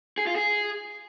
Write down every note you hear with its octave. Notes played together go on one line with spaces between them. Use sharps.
G#4
F4
G#4